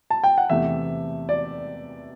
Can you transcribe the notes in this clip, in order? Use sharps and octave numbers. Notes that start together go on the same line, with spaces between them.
A5
G5
F#5
E2 C3 E3 A3 E5
D5